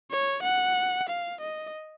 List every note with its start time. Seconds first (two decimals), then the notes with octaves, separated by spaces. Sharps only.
0.11 C#5
0.43 F#5
1.09 F5
1.41 D#5